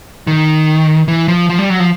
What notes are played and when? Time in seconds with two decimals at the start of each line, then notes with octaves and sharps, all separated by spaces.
0.27 D#3
1.08 E3
1.28 F3
1.49 F3
1.59 G3
1.70 F#3
1.80 F3